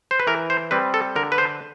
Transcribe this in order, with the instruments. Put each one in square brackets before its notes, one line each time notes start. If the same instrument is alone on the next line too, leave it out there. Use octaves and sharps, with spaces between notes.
[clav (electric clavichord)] C5
B4
E3 A#4
C5
G3 C4 B4
A4
D3 A#4
B4
C5